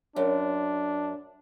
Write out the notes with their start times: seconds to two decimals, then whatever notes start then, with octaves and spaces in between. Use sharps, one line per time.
0.16 F#2 D4